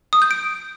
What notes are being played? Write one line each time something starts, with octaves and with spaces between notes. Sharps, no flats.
D#6
G6
D7